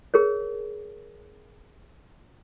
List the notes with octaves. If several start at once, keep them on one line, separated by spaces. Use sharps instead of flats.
G#4 A#4 C#5